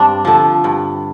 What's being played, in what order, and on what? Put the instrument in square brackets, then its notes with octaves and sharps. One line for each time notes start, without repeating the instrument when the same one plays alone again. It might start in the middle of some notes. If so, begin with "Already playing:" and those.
Already playing: [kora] G2 C4 D4
D3 F3
G2